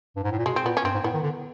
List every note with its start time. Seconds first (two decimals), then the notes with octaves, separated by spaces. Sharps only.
0.16 G2
0.23 G#2
0.32 A2
0.38 A#2
0.46 B2 G#3
0.56 C4
0.65 A#2 B3
0.77 C#4
0.84 G2 C4
0.94 G#2
1.04 A2 B3
1.14 D#3
1.23 D3